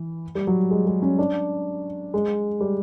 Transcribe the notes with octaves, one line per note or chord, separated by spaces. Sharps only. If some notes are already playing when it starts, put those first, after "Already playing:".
Already playing: E3
G3
F#3
G#3
G#3
C#4
D4
G#3
G3